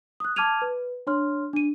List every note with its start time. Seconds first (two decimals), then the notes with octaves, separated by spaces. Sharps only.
0.20 D#6 F#6
0.36 A5 D6 F6 G#6 D#7 F7
0.62 B4
1.07 D4 C#5 C6 F6
1.53 D4 D#7